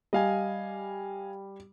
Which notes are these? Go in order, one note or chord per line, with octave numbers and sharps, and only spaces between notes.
G3 D#5 F5 G#5